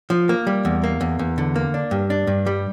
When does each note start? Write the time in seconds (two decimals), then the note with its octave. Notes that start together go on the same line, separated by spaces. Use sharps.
0.10 F3
0.29 A#3
0.47 G3
0.65 E2
0.84 A#3
1.01 E2
1.19 E2
1.38 D3
1.56 A#3
1.74 D4
1.91 G2
2.10 D4
2.27 G2
2.46 G3